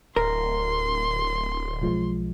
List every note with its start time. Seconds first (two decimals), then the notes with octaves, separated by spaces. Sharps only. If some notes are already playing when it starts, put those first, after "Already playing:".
0.16 D1 A#4 C6
1.82 B1 F3 G#3